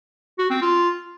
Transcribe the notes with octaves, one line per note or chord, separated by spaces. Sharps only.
F#4
C4
F4